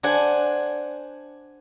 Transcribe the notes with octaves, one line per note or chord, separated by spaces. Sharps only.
D4 C5 F#5 G#5